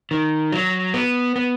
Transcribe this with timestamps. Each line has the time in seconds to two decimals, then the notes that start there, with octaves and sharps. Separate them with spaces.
0.11 D#3
0.53 F#3
0.94 B3
1.36 B3